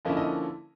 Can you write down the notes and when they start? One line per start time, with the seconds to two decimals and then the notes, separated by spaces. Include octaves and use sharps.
0.05 D3 F3 A#3 C#4 E4 D#5
0.17 D#5